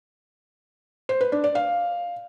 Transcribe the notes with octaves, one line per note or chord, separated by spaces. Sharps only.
C5
B4
D4
D5
F5